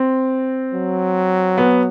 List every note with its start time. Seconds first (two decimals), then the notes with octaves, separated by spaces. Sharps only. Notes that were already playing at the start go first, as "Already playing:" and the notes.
Already playing: C4
0.74 F#3
1.58 B3